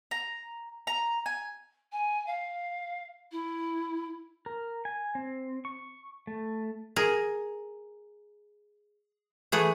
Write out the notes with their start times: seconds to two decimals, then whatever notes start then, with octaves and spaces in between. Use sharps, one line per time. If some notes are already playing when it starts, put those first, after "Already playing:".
0.11 A#5
0.87 A#5
1.26 G#5
1.92 G#5
2.26 F5
3.31 E4
4.46 A#4
4.85 G#5
5.15 C4
5.65 C#6
6.27 A3
6.96 G#4 A#4
9.52 E3 A3 G#4 F#5